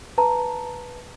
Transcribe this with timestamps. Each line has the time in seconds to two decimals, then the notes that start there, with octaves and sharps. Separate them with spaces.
0.18 B4 A5 A#5